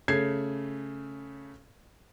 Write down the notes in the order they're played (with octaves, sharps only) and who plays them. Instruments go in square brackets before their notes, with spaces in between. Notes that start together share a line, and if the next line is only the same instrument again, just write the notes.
[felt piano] C#3 A3 G#6 C7